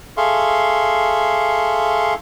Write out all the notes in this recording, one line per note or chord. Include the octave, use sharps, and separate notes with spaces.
G#4 A4 E5 F5 C6 C#6